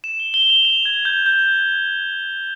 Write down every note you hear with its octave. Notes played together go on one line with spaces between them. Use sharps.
E7
G7
G7
F7
F7
G#6
G6
G6